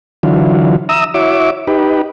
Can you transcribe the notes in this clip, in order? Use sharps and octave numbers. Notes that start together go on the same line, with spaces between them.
D3 E3 F#3 F4
E5 A#5 D#6 E6
E4 F#4 C#5 E5 D6
D#4 G4 B4